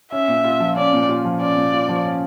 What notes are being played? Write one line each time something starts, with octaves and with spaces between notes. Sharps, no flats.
C#4 E5
A#2
F4
F3
C#4 D5
A#2
F4
F3
C#4 D5
A#2
F4
F3
C#4